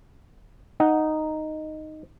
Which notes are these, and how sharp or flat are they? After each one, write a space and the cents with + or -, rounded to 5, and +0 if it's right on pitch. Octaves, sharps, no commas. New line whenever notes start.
D#4 -5 F#5 +0